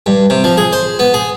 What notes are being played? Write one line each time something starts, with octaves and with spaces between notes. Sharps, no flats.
G2
C3
F3
G#4
C5
B3
G#4